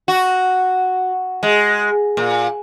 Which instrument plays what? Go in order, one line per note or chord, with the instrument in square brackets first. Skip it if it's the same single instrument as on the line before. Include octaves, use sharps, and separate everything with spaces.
[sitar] F#4
G#3
A#2